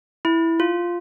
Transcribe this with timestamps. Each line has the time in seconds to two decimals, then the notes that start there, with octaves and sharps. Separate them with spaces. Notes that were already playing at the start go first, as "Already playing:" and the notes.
0.25 E4
0.60 F4